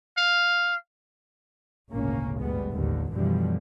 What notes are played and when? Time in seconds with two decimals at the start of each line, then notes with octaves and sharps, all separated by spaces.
0.17 F5
1.93 G#1 D2 A#2 C#3 A#3 C#4
2.40 G1 D2 G3 G#3 B3
2.74 A1 D#2 A#2 D3
3.15 F#2 B2 D3 E3 F3 G3